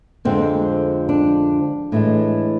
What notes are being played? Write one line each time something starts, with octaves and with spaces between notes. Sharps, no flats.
F2 D3 F3 G#3 C4
D4
A2 E3 G#3